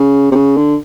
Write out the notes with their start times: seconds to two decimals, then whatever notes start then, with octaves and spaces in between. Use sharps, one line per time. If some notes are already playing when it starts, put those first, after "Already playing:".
Already playing: C#3
0.31 C3
0.35 C#3
0.57 D3